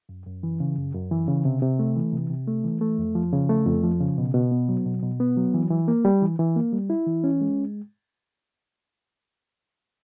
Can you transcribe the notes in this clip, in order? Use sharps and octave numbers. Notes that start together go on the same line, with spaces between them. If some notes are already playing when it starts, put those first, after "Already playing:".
F#2
F#2
E3
C#3
F#2
F#2
E3
C#3
C3
C3
A3
E3
C3
C3
A3
E3
A3
F2
F3
C#3
A3
F2
F3
C#3
B2
B2
B3
F#3
B2
B2
B3
F#3
E3
E3
A#3
G3
E3
E3
A#3
G3
E4
E3
C#4
G#3